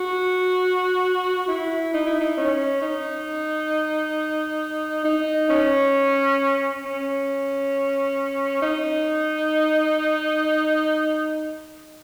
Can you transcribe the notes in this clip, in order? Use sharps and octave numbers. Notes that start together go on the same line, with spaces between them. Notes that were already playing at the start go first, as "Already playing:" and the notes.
Already playing: F#4
E4
D#4
E4
D#4
C#4
D#4
D#4
C#4
C#4
D#4